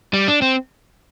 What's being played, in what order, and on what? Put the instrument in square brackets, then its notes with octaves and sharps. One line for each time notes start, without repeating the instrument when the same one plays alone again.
[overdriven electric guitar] G3
D4
C4